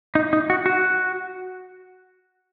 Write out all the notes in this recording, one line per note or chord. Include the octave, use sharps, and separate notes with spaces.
D#4
D#4
F#4
F#4